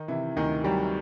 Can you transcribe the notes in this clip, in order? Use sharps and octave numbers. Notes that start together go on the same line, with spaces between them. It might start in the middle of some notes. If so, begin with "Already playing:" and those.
Already playing: D#3 D#4
C3 E3 E4
D2 D#3 D#4
F#3 G3 G4